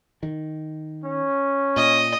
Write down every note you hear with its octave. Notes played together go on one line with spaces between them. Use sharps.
D#3
C#4
A#2 D#5